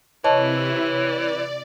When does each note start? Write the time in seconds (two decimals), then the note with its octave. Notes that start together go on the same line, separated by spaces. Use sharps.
0.24 C3 E3 E4 C#5 D#5 A5
0.93 D5